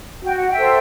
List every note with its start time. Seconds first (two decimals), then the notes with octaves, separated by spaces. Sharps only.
0.23 F#4 G5
0.36 F#5
0.50 E5 G5
0.56 A4 C5